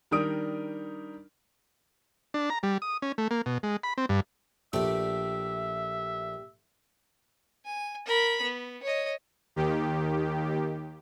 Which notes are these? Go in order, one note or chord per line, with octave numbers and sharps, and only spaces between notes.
D#3 G3 D4 A#4 D#6 D7
D4
A#5
G3
D#6
C#4
A3
A#3
B2
G#3
B5
C4
G2
A#1 A3 G4 D5 E5
G#5
A#4 B5
B3
C#5 D#5
D#2 D#3 G4